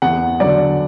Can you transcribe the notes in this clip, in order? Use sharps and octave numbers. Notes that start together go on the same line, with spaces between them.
E2 F#5
D3 F#3 D5